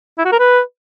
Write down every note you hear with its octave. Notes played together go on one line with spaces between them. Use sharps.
E4
F#4
A#4
B4